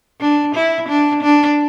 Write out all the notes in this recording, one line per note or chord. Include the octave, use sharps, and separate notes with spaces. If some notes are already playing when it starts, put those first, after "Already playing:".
D4
E4
D4
D4